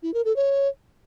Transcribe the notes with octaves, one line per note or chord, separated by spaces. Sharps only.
E4
A#4
A4
C#5